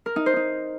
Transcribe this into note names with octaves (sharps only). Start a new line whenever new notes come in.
A#4
D#4
C5
D#4